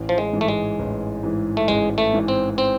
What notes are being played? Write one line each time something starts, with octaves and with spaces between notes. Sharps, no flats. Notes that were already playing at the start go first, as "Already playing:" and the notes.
Already playing: A1
F3
G#3
G#2 E3
A3
G#3
A1
G#2 E3
A3
A1 G#3
A3
G#2 E3
C4
C4